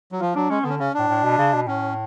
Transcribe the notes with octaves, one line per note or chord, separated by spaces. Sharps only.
F#3
F3 F4
F#3 D4
G#3 C#4
B3
D3 C#4
C#3 C#4
A2 D4
A2
B2
C#3
B2
A2 C#4